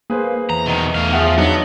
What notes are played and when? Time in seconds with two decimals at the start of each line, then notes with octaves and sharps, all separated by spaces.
0.10 A#3 G#4 B4 C5
0.50 E2 A#5
0.66 B2 D#3
0.95 E2 A3 F5
1.13 F3 G#4 E5 F#5
1.38 F#3 B3 D4 D#4